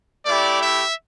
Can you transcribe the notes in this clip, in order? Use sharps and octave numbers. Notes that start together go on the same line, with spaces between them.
A3 E4 G4 D5
E5